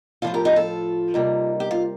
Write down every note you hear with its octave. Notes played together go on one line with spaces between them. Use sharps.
A2 F3 A3 F4 A4
G4 A#4
D#4 G4
F4 A4
C3 G3 A#3 D#4
G4
F4